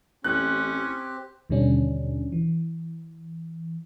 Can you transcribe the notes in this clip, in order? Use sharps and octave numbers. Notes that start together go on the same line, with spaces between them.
A1 C4 C#4 G4 F#6
D#2 B2 D3 G3 C#4 D4
E3